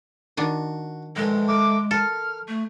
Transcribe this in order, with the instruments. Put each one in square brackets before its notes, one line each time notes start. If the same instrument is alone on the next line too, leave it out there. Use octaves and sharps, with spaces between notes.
[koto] D#3 D4 [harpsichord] F#4
[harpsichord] A#1 A2 E3 [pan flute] G#3
[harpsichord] A3 A#4 [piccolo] D6
[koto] A4 [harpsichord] A#4 [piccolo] F6
[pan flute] A3